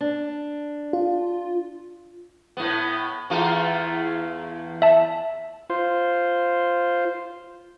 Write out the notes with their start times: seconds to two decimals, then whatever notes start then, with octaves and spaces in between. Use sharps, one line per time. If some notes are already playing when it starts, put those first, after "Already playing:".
0.01 D4
0.93 F4
2.57 A2 B3
3.30 E2 A3 F4
4.82 E5 A5
5.70 F4 C5